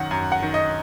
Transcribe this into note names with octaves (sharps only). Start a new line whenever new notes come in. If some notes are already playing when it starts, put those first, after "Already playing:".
Already playing: F#2 D#3 F#5
F#2
F#5
D#3
D#5